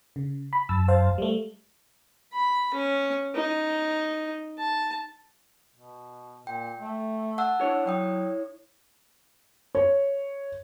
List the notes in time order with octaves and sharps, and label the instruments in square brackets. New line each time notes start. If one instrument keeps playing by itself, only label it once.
[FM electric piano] C#3
B5
[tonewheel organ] F#2 A5 [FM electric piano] E6
[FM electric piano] C5 F5
G3 A3
[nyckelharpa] B5
C#4
D#4
A5
[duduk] B2
[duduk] A#2 [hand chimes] G5
[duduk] A3
[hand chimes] F#5 A5 E6
[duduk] D4 [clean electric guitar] E4 C#5
[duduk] F#3 [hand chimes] D5 G5 D#6
[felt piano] C#5